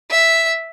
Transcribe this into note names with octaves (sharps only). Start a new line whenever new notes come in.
E5